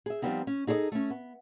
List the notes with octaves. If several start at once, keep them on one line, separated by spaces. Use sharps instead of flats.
G#4 E5
F3 G3 G#3 B3 C4 D#4
C#4
D#4 G#4 A4 C#5 D#5
A3 C#4
B3